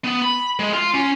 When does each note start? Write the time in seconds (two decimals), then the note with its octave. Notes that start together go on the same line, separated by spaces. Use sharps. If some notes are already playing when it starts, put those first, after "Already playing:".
0.04 B3
0.22 B5
0.60 G#3
0.74 F4
0.95 C#4